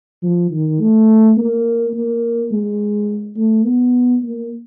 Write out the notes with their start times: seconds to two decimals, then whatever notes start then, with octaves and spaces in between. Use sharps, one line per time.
0.22 F3
0.51 D#3
0.80 A3
1.37 A#3
1.94 A#3
2.51 G#3
3.36 A3
3.65 B3
4.23 A#3